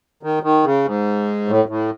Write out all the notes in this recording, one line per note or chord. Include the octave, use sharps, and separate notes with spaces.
D#3
D#3
C#3
G#2
A2
A2